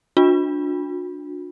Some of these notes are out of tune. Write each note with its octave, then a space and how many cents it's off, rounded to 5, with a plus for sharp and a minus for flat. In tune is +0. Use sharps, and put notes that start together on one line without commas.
D4 +0 F#4 -45